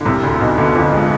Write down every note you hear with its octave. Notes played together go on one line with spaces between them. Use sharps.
D3
C2 C3
D2 D3
B1 B2
D2 D3
F2 F3
G#3